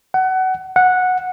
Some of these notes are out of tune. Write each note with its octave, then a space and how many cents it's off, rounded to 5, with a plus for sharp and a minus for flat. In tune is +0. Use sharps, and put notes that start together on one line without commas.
F#5 +25
F#5 -10